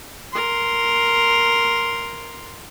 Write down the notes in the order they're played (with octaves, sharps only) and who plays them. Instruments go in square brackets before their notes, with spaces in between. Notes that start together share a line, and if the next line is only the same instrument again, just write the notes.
[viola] A#4 C6